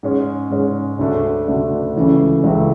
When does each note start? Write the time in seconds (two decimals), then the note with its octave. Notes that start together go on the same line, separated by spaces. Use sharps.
0.03 G#2 G#3 C#4
0.50 G#2 G#3 C#4
0.99 D2 D3 A3 D4
1.48 D2 D3 A3 D4
1.96 C#2 C#3 E3 A3
2.44 C#2 C#3 E3 A3